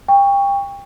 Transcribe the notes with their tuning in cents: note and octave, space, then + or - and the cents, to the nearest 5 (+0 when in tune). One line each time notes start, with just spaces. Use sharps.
G5 +30 C#6 +10